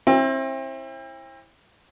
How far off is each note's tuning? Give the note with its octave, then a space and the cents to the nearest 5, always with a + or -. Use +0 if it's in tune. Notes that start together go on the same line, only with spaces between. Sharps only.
C4 +35 E4 +0 G5 +35